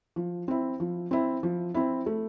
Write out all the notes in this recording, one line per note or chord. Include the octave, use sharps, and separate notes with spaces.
F3
C4 E4
F3
C4 E4
F3
C4 E4
A3